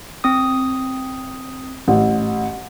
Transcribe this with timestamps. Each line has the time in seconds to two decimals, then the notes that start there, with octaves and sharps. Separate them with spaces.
0.24 C4 D#6
1.88 A1